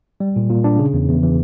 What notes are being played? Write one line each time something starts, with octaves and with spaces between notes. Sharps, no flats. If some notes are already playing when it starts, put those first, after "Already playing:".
G3
A#2
A#2
D4
C#3
E2
E2
E3